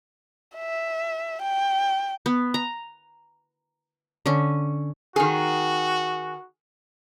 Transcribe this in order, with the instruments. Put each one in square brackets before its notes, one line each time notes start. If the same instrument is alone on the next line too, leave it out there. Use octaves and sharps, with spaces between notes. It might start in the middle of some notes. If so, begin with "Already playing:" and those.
[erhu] E5
G5
[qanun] B3
A#5
D3 C#4
[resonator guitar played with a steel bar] D#3 G#4 [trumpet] F#4